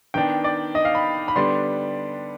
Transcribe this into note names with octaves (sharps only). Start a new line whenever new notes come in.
D#3 B3 D4 G5
D5
D#5
F5
B5
B5
D3 G3 B3 D4 C6